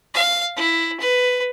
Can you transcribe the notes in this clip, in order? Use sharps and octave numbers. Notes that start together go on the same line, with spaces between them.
F5
E4
B4